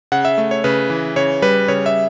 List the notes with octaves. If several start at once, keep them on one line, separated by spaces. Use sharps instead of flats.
C#3 F#5
E5
A3
C#5
C#3 B4
E3
C#3 C#5
G3 B4
C#3 C#5
E5